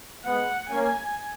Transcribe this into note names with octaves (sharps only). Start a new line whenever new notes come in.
G#3 B3 F#5
A#3 C#4 G#5